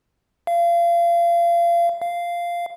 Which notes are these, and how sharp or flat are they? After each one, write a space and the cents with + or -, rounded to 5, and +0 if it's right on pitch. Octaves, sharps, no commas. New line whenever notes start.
F5 -30
F5 -10